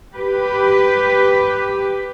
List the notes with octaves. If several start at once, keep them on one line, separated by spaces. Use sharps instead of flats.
G4 B4